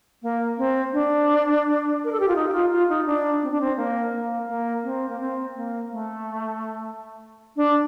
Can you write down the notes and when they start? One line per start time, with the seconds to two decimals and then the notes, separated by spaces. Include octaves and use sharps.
0.23 A#3
0.58 C4
0.93 D4
2.05 A#4
2.12 A4
2.20 G4
2.28 F4
2.36 D#4
2.49 G4
2.53 F4
2.71 F4
2.89 D#4
3.06 D4
3.43 C4
3.51 D4
3.61 C4
3.77 A#3
4.13 A#3
4.45 A3
4.48 A#3
4.84 C4
5.09 A#3
5.20 C4
5.55 A#3
5.91 A3
7.57 D4